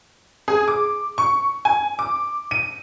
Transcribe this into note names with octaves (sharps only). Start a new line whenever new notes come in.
G#4
D6
C#6
G#5
D6
D#7